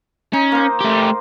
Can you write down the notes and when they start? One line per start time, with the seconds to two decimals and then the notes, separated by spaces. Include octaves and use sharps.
0.33 C#4 D#4
0.52 A#3 C5
0.81 A3 G4